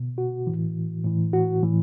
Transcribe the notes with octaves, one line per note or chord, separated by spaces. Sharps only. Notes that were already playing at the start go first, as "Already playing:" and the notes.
Already playing: B2
F#4
A2 E3
A2 E3
F#4
A2 E3